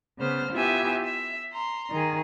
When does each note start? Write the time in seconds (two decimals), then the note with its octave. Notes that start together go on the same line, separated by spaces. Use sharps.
0.18 C#3 B3 C5 F6
0.52 B3 E4 F4 G4 E5 G#5
1.03 E5
1.52 A#5 C6
1.91 D#3 G#4